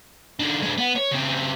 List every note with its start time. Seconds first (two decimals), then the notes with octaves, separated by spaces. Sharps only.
0.39 D#3 D4
0.62 G#3 D4
0.78 B3
0.96 C#5
1.12 C#3 C4